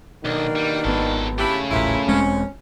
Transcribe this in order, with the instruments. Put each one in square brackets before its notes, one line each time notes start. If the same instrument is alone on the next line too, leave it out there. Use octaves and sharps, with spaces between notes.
[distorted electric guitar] B1 [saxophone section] B2 A#3 D4 [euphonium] D#3
[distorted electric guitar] G3
[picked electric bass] G#1 B3 [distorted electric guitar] F#3 A4
[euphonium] C#3 [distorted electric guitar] A3 B5 [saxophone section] D4 E4 G4
[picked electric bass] D#1 A1 [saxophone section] A#2 E4
[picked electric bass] E1 G#3 C4 [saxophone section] C#4